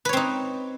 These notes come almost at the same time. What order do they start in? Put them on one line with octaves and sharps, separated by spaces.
B4 C#5 C4 D#4